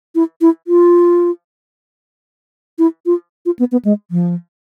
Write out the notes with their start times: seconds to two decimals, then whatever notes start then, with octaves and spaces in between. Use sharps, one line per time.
0.15 E4
0.41 E4
0.67 F4
2.79 E4
3.06 F4
3.46 F4
3.59 B3
3.72 B3
3.85 G#3
4.11 F3